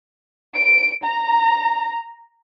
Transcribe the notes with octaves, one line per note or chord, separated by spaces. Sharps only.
D7
A#5